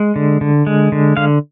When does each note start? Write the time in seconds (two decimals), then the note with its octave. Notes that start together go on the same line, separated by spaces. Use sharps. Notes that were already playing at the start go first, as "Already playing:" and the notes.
Already playing: G#3
0.16 D3
0.41 D3
0.67 G#3
0.92 D3
1.17 D3 F5